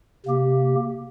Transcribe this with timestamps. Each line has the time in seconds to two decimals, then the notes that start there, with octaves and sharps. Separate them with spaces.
0.26 C3 A#3 G4